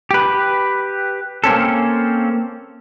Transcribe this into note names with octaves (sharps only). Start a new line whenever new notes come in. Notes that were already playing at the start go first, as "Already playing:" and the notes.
G4 B4
A#3 C4 C#4 A4